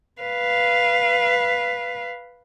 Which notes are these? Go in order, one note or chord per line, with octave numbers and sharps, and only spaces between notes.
B4 F5